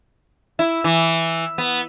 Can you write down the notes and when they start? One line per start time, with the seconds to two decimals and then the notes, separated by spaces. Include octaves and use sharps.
0.59 E4
0.84 E3
1.58 B3